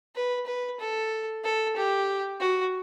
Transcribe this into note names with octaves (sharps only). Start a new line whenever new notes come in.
B4
B4
A4
A4
G4
F#4